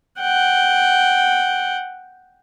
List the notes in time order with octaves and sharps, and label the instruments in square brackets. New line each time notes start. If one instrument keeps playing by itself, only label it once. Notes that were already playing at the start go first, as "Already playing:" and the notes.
[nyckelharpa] F#5 G5